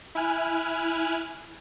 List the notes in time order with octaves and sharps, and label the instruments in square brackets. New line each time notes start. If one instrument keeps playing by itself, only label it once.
[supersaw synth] E4 G#5 F6 F#6